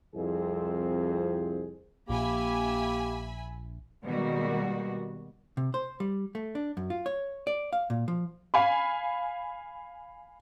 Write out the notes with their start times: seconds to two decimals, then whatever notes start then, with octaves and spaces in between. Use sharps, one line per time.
0.14 C2 F2 C4 G#4
2.09 A#1 A#3 G4 E5 G#5 B5
4.05 B2 D#3 G3 G#3 A#3 F#4
5.57 C3
5.74 C5
6.00 G3
6.35 A3
6.55 D4
6.77 F#2
6.90 F4
7.06 C#5
7.47 D5
7.73 F5
7.90 A#2
8.08 F3
8.54 F5 G#5 B5